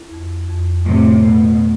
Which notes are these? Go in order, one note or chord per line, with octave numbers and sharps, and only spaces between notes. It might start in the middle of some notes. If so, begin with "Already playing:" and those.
Already playing: E4
F2
F2
A2 C3 A3
B2 A3